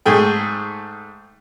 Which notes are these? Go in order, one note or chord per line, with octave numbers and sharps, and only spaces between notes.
G#2 A3 G#4 G5